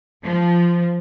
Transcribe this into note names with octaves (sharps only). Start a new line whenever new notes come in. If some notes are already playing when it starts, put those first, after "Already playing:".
F3